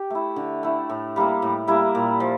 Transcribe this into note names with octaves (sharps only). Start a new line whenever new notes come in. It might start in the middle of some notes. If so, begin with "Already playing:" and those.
Already playing: G4
A3 E4
D3
A3 E4
A2
G3 A#3 E4
A2
G3 A#3 E4
A#2
F3